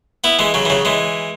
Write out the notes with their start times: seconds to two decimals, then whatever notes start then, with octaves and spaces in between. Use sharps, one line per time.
0.24 B3 E4
0.39 E3 G#3
0.54 C#3 F#3
0.65 E3
0.70 C#3 F#3
0.85 E3 G#3